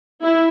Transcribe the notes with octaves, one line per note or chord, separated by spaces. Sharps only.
E4